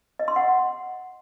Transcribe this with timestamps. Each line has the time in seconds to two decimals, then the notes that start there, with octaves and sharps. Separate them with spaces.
0.19 D#5
0.28 C6
0.36 F#5